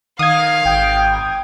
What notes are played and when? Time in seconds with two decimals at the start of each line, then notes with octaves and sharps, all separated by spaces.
0.19 D#3 F5 D#6 G#6
0.65 G#1 G5